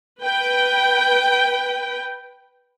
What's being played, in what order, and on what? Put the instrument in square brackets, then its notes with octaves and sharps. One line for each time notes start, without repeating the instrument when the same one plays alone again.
[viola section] B4 G5